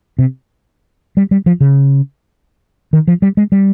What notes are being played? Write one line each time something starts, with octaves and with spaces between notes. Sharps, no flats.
C3
G3
G3
F3
C#3
D#3
F3
G3
G#3
G3